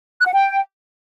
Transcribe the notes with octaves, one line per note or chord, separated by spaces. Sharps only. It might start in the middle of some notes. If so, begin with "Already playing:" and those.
F#6
F#5
G5